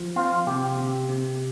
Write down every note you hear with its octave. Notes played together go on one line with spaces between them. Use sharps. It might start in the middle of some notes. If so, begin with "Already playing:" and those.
Already playing: F3
C4 F4
C3 G4
C3
C3